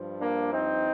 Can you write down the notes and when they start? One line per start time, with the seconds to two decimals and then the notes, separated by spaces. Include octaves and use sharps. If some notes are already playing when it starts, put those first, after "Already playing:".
Already playing: G2 F3
0.20 A#3 D4
0.51 C4 D#4